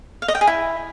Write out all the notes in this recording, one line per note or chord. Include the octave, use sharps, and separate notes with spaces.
F5
D#5
G5
G#4
E4